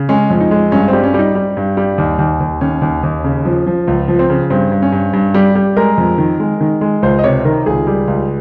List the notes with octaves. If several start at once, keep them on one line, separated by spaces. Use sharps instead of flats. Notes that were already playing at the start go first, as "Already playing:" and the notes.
Already playing: C#3
G#3 C#4
F2
D#4
G#3
G2 C#4
C4
G3
C#4
G3 D#4
G3
G2
G3
D#2
D#2
D#2
D#2 C#4
D#2
D#2
C#3
F3
F3
C#2
F3
C4
C#3
G2 C4
G2
C#4
G2
G2
G3
G3
G#3 A#4
F2
D#3
G#3
D#3
G#3
C#2 C5
D#5
C3 C#5
D#3 A#4
C#2 G#4
G3
C#2